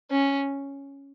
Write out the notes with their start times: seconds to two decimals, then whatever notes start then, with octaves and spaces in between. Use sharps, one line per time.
0.11 C#4